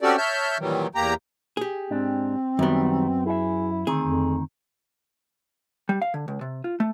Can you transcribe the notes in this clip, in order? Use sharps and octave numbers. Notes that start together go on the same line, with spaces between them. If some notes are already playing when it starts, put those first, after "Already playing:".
C4 C#4 F#4 G4 A4 D5
C#5 E5 A5 F6 G6
A#2 D#3 E3 F#3 G3
E2 A#3 G4 A#5
G4 G#4
G#2 C4 D4
F#2 D#3 G3 B3
E4 G#4 E5
D2 D#3 C4 G#4
F2
G3
F5
D3
C#2
C3
F4
A3